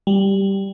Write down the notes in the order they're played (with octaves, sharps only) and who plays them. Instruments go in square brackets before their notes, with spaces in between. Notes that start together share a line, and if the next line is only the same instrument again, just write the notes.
[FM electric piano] G3